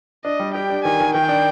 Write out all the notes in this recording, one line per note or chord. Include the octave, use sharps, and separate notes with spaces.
D4 D#5
G3
G4 G5
D4
D#3 G#5
D#3
D#3 G5
D4